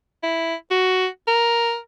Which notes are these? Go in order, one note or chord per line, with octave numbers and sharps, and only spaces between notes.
E4
F#4
A#4